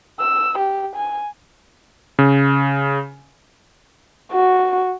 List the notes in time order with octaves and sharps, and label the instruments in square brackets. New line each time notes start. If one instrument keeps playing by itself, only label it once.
[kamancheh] E6
G4
G#5
[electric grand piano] C#3
[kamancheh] F#4